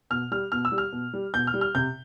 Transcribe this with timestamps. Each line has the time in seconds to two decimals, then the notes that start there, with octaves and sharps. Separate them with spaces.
0.10 B2 F6
0.32 G3 F6
0.52 B2 F6
0.65 E6
0.72 G3
0.78 F6
0.92 B2
1.14 G3
1.34 B2 G6
1.47 F6
1.54 G3
1.61 F6
1.75 C3 G6